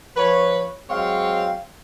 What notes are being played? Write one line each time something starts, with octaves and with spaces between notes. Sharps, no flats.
F3 B4 C#5
F#3 G#3 C4 C#5 F5